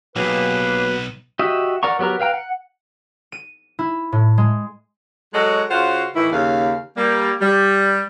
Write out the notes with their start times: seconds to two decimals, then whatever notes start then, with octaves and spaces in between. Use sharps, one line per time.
0.16 B1 F#3 A#3 B3 G4 G#4 B4
1.39 F#4 G4 D#5 E5
1.83 A#4 D5 F#5 A#5 C#6
1.99 F#3 B3 G4 A#4 A#5
2.20 B4 F5 G5 A#5
2.34 F#5
3.32 D#7
3.79 E4
4.12 A2
4.38 G#3
5.34 F#3 G#3 F#4 A4 C#5 D#5
5.70 C#3 F4 F#4 C5 F5 F#5
6.15 A2 D#3 E3 E4
6.32 D#2 C#3 F5
6.97 G3 A#3
7.41 G3